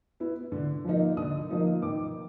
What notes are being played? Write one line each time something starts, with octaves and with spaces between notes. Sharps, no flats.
B3 E4
D3
F3 A#3 D#4
D3 D#6
F3 A#3 D#4
D#3 D6